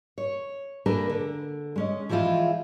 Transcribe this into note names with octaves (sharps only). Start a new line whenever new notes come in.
C#5
A3 A#3 D4 G#4 A#4 B4
D3
G#3 C#4 D#5
E3 F3 G#3 E4 F4